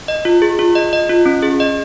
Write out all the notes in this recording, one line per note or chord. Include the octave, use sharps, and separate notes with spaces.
D#5
F4
G#4
F4
D#5
D#5
F4
C#4
G#4
D#5